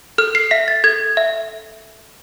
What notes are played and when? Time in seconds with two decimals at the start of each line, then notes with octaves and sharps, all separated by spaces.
0.18 A4 F6
0.35 C7
0.51 E5 B6
0.68 A6
0.84 A4 G#6
1.17 E5